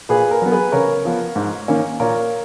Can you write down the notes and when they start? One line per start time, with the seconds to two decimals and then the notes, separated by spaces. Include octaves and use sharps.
0.09 A#2 G#4 B4
0.31 A#4
0.42 F#3 B3
0.51 G#4 B4
0.72 C#3 A#4 C#5
1.05 F3 B3
1.36 G#2
1.68 D#3 A#3 C#4
2.00 A#2 A#4 C#5